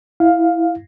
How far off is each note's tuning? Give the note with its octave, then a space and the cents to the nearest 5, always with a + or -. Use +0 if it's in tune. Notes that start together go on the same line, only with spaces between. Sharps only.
E4 +0 F5 +10